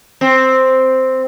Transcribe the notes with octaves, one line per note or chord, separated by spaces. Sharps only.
C4